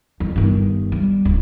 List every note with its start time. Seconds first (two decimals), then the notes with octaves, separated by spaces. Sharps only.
0.20 F2
0.36 G1 D#3
0.92 G3
1.25 D1